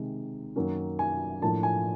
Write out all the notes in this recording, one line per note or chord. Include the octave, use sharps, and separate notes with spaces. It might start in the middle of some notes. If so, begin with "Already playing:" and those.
Already playing: C3 D#3 G#3
F#2 D#3 F#3 A#3 C#4
G#5
A2 F3 A#3 D4 A5
G#5